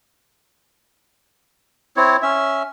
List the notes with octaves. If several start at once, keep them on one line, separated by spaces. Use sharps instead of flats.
C4 E4 C#5
C#4 E5